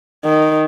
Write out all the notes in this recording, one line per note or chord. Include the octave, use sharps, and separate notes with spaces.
D#3